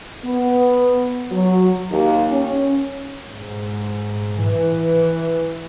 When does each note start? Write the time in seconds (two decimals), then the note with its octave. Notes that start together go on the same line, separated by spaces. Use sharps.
0.24 B3
1.32 F#3
1.90 D#2
2.31 C#4
3.26 G#2
4.43 E3